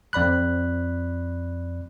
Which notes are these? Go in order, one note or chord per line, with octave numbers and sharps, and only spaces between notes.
F2 D5 B5 F#6